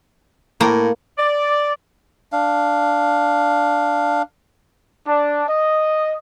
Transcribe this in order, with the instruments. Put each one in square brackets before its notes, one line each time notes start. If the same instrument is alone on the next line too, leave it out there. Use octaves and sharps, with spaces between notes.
[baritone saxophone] A2 [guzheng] A#3 A#5
[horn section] D5
[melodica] D4 F5
[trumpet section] D4
D#5